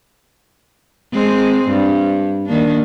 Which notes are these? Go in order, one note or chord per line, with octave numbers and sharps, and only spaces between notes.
G#3 C4
G2
D#3 A#3 D4